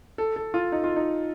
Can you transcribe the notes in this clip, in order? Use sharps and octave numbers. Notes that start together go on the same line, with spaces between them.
A4
A4
F4
D#4
F4
D#4